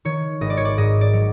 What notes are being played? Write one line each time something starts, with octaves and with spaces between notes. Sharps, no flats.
D#3 C#5
G#1 D#5
D5
C#5
D5
G#2 D#5
D5
F#3